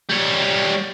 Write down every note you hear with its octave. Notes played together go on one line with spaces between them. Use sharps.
G3 C#5